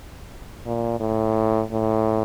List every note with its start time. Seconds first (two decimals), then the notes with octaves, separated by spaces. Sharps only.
0.66 A#2
1.00 A2
1.71 A2